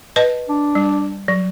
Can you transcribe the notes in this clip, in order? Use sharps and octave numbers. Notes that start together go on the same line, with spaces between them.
B4 D#5 A5
D4
G3
F#3